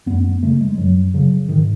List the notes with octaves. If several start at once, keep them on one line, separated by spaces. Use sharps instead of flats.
F#2 B3
B3
C#3 A3
G#3
F#2 F#3
C#3 F#3
G#2 D#3